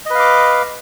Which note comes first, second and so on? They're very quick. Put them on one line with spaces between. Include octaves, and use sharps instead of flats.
D#5 B4 F5 D6